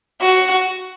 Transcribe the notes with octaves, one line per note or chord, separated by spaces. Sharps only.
F#4